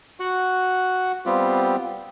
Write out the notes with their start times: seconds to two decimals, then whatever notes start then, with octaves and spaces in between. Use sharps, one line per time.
0.20 F#4 F#5
1.26 G3 B3 C4 F4 G4